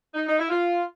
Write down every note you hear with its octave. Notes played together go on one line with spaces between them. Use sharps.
D#4
D#4
E4
F4